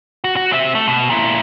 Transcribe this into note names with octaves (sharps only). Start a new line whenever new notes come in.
F#4
F#4
C4 E5
A3
B2
A#2 E4